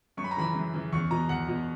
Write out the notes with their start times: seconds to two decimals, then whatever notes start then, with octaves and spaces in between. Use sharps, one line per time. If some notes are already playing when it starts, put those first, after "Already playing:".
0.17 F#2 C#6
0.24 B5
0.31 A#5
0.37 C#3 E3 B5
0.54 F#2
0.73 C#3 E3
0.93 E2 C#6
1.11 B2 A#5
1.29 E2 F#5
1.48 B2